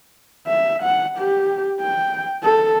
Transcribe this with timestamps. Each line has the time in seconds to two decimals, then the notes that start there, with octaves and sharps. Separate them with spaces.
0.47 E5
0.82 F#5
1.18 G4
1.81 G5
2.43 A4